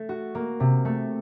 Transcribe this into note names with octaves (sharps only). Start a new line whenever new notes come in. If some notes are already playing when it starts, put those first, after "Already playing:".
Already playing: A3 A4
F#4
A#3
C3
A3